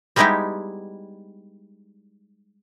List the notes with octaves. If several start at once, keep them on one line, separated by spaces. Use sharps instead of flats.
G3 G#3 B3 D#4 E4 G4